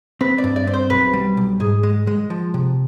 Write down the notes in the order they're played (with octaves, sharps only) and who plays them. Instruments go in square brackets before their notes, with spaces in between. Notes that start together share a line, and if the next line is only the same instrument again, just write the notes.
[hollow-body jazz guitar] C4 [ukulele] B4
[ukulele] D5
[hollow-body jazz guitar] G2
[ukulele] D5
[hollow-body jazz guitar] C4
[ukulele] C5
[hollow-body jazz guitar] B1 [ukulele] B4
[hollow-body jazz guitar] G3
B1
[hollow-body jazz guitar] G#2 [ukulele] G#4
[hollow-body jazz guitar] G#3
G#3
F3
C3